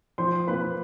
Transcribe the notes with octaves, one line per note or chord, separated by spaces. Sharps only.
F3 C5 C6
A#3 B4 B5